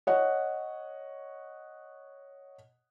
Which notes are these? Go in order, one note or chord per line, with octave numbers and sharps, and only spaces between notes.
C#5 D#5 F#5